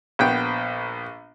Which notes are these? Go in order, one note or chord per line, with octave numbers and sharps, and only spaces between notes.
A#1 B3 G5